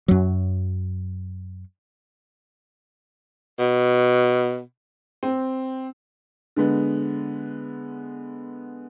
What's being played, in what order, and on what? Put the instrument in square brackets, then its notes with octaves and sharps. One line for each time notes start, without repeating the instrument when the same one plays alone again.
[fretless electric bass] F#2 F#3
[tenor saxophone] B2
[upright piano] C4
D3 G#3 B3